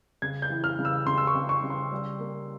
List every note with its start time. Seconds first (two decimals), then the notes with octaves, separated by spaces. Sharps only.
0.22 C#3 G#6
0.42 G6
0.50 E3
0.64 F6
0.79 C#3
0.85 E6
1.06 C#3 C6
1.18 E6
1.27 C#6
1.35 C#3
1.49 C#6
1.63 C#3
1.70 C6
1.92 G3
2.20 A#3